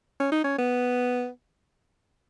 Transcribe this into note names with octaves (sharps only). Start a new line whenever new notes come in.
C#4
D#4
C#4
B3